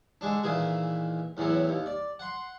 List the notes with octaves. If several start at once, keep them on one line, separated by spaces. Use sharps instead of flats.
D3 G#3 D4
A#2 D#3 E3 G#4
E2 A2 E3 F#3
D#2
D5
F#5 C6